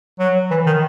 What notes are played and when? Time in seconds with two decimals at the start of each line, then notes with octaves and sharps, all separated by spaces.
0.19 F#3
0.51 E3
0.66 D#3